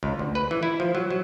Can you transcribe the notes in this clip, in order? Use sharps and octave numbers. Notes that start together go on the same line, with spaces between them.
C#2
D2
B4
E3
E4
F3
F#3
F#3